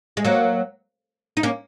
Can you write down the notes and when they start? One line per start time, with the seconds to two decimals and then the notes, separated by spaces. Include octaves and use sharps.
0.17 G#3
0.25 F#3 A#3
1.37 D#4
1.43 A#3 C#4